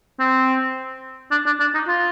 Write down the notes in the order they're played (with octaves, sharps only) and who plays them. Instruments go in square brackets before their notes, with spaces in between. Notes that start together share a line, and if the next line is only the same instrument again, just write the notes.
[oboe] C4
D4
D4
D4
D#4
F4